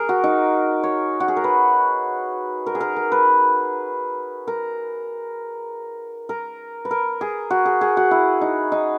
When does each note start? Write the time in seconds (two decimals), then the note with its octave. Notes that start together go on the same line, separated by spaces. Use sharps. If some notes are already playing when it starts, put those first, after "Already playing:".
Already playing: G#4 A#4
0.09 F#4
0.24 D#4
0.84 C#5
1.20 F#4
1.28 G#4
1.37 A#4
1.44 B4
2.66 A#4
2.75 G#4
2.81 A#4
2.96 A#4
3.12 B4
4.47 A#4
6.29 A#4
6.85 B4
6.91 A#4
7.21 G#4
7.51 F#4
7.66 G#4
7.81 G#4
7.97 F#4
8.11 E4
8.41 D#4
8.72 D#4